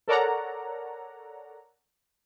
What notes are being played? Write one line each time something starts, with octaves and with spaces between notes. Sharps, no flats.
A4 A#4 C#5 D5 F#5 A#5